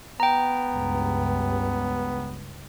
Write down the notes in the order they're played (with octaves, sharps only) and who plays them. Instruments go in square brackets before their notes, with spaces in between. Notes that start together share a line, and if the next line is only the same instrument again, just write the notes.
[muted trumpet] B3 [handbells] G5 A#5
[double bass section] C#2 G2